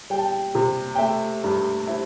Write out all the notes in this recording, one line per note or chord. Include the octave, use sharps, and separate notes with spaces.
G3 G5
A5
G5
C3
G5
A3 E5
G2
E4 C5